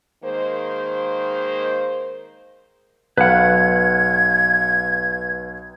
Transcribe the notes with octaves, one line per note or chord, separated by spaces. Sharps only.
D#3 G#3 A#3 C5
B1 B4 F5 F#5 G#6